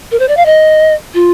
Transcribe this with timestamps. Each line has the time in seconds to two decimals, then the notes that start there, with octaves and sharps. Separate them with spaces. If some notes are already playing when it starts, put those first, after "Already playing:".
0.11 A#4
0.19 C5
0.28 D5
0.37 F5
0.46 D#5
1.14 F4